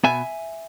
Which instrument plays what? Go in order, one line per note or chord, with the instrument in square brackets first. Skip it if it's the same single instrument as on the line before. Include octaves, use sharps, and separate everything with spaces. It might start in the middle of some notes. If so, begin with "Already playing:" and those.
[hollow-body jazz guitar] B2 B3 E5 G#5